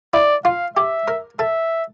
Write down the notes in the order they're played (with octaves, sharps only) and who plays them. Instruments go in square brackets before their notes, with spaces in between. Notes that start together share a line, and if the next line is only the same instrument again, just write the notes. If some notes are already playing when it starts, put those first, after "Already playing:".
[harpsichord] E4 [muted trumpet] D5
[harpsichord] F4 [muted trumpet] F5
[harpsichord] G4 [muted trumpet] E5
[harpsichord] A#4
[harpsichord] A4 [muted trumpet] E5